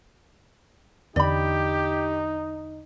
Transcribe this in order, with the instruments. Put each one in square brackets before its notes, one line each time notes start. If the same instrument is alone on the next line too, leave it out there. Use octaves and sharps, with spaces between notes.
[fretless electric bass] E2 D3 [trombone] D#4 [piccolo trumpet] G4 [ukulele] D5 B5